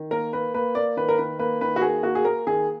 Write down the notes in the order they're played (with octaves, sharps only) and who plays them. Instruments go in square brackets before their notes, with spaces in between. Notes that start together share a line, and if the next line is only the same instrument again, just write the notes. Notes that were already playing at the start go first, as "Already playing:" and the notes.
Already playing: [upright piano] D#3
A#3 A#4
A#3 B4
A#3 B4
A#3 D5
D#3 B4
A#4
D#3 B4
A#3 B4
D#3 B4
F#4
A#3 G#4
A#3 F#4
G#4
A#3 A#4
D#3 G#4